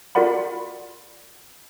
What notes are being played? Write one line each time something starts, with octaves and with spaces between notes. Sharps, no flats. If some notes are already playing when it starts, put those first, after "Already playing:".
F4 F#4 A#4 D5 F#5 B5